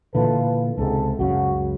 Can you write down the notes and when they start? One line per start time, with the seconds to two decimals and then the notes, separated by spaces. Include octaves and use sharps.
0.15 A#2 D3 E3 F4 A4 B4
0.78 C#2 G#2 C3 A4
1.19 C#2 F#2 C#3 F#4